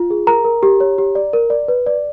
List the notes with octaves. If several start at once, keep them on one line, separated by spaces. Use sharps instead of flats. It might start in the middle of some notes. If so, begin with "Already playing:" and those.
Already playing: F4
G#4
A#4 A#5
A#4
G4
C#5
G4
D5
A#4
D5
B4
D5